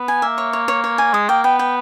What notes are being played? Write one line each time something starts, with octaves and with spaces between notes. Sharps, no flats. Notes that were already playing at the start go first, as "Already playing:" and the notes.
Already playing: B3
G#5
A#3 E5
C#5
C#5
C#5
C#5
G#5
G#3 D#6
A#3 G5
B3 G5
G5